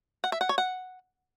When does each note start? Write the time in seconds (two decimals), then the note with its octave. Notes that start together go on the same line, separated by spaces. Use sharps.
0.24 F#5
0.32 E5
0.41 F#5
0.49 C#5
0.58 F#5